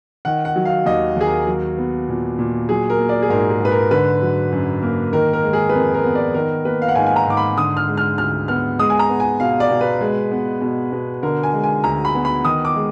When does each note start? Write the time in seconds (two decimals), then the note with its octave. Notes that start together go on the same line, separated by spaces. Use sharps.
0.25 D#3 F#5
0.45 F#5
0.56 F#3
0.65 F5
0.85 D#2 D#5
1.16 D#2 G#4
1.26 A#4
1.47 F#3
1.78 B3
2.08 A#2
2.39 A#2
2.69 F#3 G#4
2.90 A#4
2.99 A#3
3.09 D5
3.22 G#4
3.30 G#2 A#4
3.50 G#4
3.61 G#2 B4
3.71 A#4
3.91 D3 B4
4.22 F#3
4.52 F#2
4.83 A#3
5.13 D#3 A#4
5.33 A#4
5.44 G#3
5.53 G#4
5.69 B4
5.74 F2 A#4
5.94 A#4
6.04 B3
6.15 D5
6.34 D#3 A#4
6.65 A#3 B4
6.82 F5
6.89 F#5
6.95 G#2 G#5
7.06 G#5
7.16 A#5
7.27 G#2 D6
7.37 B5
7.57 D3 D#6
7.77 F6
7.88 G#3
7.97 F6
8.18 D2 F6
8.48 B3 F6
8.79 G#3 D#6
8.90 G#5
8.99 A#5
9.10 B3
9.20 G#5
9.40 B2 F5
9.60 D5
9.71 B2
9.81 B4
10.01 G#3
10.32 B3
10.62 B2
10.92 B2
11.23 D3 A#4
11.43 G#5
11.54 G#3
11.64 G#5
11.84 D2 A#5
12.05 B5
12.15 B3
12.25 B5
12.45 D#3 D#6
12.65 D6
12.76 G#3